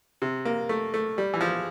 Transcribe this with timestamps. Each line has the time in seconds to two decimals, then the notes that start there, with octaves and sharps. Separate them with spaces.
0.22 C3
0.45 A#3
0.69 A3
0.94 A3
1.18 G3
1.34 E3
1.41 F3